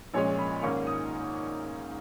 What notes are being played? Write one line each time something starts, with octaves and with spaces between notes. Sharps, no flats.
A#1 A#2 G#3 C#4 C#5
B5
G#2 D#3 A#3 C#4 C#6
D#6